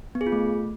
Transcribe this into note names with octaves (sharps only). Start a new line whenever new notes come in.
B3
G#4
F4
A3